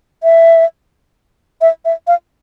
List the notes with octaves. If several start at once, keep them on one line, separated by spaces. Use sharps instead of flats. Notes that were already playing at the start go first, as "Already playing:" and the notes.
E5
E5
E5
F5